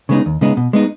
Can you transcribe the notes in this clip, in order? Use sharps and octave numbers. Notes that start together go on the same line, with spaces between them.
C#3 G#3 B3 D#4
D#2
C#3 G#3 B3 D#4
B2
G#3 B3 D#4